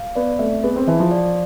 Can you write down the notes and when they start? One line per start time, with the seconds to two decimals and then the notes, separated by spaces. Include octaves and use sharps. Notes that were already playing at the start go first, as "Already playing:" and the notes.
Already playing: F5
0.15 B3 D5
0.39 A3 C4
0.63 B3 G#4
0.76 C4
0.87 E3 A5
1.00 F3
1.11 D5